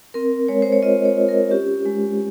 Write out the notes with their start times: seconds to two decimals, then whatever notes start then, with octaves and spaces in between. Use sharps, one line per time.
0.14 C4 A#4
0.48 G#3 C#5
0.62 C5
0.72 C#5
0.83 F4 D#5
1.05 C#5
1.17 F4
1.29 A#4
1.51 C#4 G4
1.86 G#3